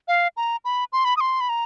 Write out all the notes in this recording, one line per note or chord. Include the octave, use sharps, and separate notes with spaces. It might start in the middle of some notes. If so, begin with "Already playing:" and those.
F5
A#5
B5
C6
B5
D#6
C6
B5
A#5